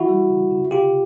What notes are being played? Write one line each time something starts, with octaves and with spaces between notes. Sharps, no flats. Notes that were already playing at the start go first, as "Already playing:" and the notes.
Already playing: E3 E4 F#4
G3
C#3
C#3
C3 F4 G4